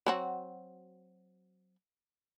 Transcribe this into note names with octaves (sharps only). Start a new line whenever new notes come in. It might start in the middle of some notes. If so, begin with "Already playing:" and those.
F#3 C4 F#4